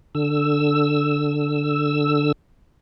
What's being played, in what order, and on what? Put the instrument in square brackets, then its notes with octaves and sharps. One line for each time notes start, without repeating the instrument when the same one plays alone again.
[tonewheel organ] D3 E6